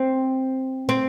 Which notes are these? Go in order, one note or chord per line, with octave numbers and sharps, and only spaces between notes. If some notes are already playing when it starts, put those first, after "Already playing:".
Already playing: C4
C4